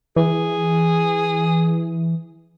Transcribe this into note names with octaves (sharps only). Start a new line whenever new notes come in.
E3 G#4